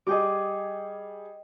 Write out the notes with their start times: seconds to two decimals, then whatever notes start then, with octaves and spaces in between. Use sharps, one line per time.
0.07 G3 G#4 D#5 G5 D6